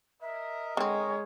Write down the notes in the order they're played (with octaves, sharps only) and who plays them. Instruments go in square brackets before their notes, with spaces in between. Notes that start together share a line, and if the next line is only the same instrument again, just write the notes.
[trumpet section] A#4 D#5 [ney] E5
[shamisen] D3 C4 [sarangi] G#3 [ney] C#5